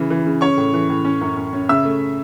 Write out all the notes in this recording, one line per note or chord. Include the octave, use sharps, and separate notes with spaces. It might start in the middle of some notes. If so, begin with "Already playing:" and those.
Already playing: C#3 E3
E3
C#3
C#4 C#5 C#6
A2
E3
A2
C#4
F#2
C#4
C#4
C#3 E5 E6
A3